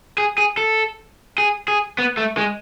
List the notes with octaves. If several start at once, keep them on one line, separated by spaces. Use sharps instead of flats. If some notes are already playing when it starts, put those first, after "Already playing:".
G#4
G#4
A4
G#4
G#4
B3
A3
G#3